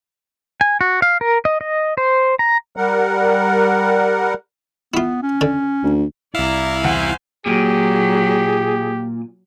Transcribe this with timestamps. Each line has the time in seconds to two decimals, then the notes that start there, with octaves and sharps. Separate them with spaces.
0.61 G#5
0.81 F#4
1.02 F5
1.21 A#4
1.45 D#5
1.61 D#5
1.97 C5
2.39 A#5
2.77 G3 A#4 F#5
4.94 B3 E4 F4
5.22 C#4
5.41 D3
5.83 D2
6.35 C2 E4 D5 F5 A#5
6.84 E2 C5 F#5 G#5
7.46 A#2 F#3 G4 G#4